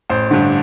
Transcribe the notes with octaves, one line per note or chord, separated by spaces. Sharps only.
A1 C5
G2 D3